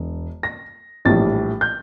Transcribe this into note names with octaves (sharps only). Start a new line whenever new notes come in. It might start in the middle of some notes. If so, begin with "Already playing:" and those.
Already playing: E1
A#6
A#1 A2 E3 G3 A6
G6